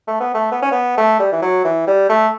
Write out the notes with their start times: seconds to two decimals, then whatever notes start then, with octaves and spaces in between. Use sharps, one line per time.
0.08 A3
0.21 B3
0.34 A3
0.52 B3
0.62 C#4
0.72 B3
0.98 A3
1.20 G3
1.32 E3
1.42 F#3
1.64 E3
1.87 G3
2.09 A3